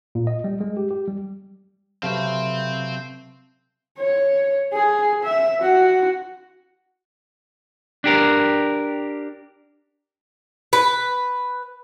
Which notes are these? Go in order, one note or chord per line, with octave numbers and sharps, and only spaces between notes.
A#2
D#5
G3
G#3
G4
G4
G3
C3 F#3 A3 C4 B4 C5 F5
C#5
G#4
E5
F#4
D4 G4 A#4
B4